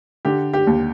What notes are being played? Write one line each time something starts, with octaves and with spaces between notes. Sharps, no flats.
D3 G4
G4
D#2